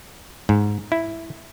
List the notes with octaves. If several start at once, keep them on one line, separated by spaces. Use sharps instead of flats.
G#2
E4